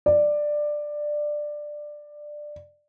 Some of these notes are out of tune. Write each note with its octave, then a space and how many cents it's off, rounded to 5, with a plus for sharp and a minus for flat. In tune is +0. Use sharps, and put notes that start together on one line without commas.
D5 +15